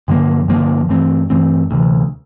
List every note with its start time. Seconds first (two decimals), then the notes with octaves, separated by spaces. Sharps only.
0.08 G2 D3 F3 A#3
0.48 G2 D3 F3 A#3
0.89 G2 E3 A3 C4
1.30 G2 E3 A3 C4
1.71 D2 C3 E3